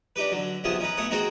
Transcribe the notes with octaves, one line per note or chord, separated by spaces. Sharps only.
D4 D#4 G4 B4
D3 F#3
B1 F2 C3 B3 F4 G#4
C#4 D#4 B4
B1 A3 C#5 F#5 D#6
D#3 C4 D#4 F#4 G#4 C5